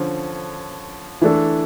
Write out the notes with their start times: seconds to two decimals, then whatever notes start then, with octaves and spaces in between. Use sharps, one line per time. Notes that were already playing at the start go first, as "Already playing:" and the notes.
Already playing: D3 F3 C#4 C#5
1.22 E3 A3 D4 A4